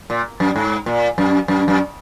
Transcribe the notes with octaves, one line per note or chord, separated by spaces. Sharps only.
A#2
F#2
G#2
A#2
F#2
F#2
F#2